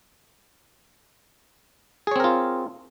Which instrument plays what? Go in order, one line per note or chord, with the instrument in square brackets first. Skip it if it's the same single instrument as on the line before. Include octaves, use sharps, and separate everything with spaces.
[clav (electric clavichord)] G#4
C#5
C4
A#4
F4